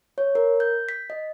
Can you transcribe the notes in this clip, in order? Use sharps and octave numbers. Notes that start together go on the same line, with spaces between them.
C#5
A#4
G6
B6
D#5